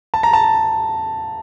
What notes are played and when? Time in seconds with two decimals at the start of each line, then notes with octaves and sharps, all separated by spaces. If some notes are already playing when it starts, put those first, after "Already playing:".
0.14 A5
0.23 A#5
0.33 A5